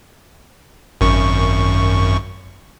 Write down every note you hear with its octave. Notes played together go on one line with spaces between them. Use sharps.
G#1 F#2 C#6